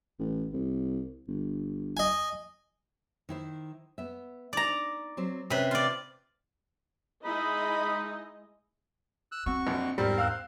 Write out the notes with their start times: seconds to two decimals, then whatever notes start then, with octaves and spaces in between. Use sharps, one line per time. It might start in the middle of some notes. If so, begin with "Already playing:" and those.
0.19 A1
0.53 C2
1.28 G1
1.97 D#5 G#5
3.29 D#3 E4 C5
3.98 B3 E5
4.53 D#4 D5 A#5
5.17 F#3 C4 C5
5.50 C3 C#4 B4
5.71 F4 D5
7.25 G#3 D#4 E4 D#5 B5
9.32 E6 F#6
9.46 C4 F#4 C#6
9.67 A#1 F2
9.98 E2 G#2 G3 C4 A#4 C5
10.18 F5 E6 F#6